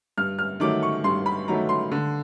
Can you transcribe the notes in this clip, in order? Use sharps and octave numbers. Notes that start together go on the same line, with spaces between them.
G2 F6
F6
D#3 F#3 A3 D6
C#6
G2 C6
B5
D#3 F#3 A3 A#5
C6
D3